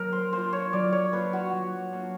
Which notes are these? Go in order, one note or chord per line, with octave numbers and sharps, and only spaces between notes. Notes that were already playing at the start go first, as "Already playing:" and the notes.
Already playing: F#3 A#3 D4 A#4
C5
A#3 D4 F4 C5
C#5
F#3 D5
C#5
A#3 D4 F4 B4
F#4
F#3
A#3 D4 F4